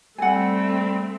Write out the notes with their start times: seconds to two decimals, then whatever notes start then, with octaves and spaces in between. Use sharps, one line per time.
0.18 G3 A3 C4 F#5 G#5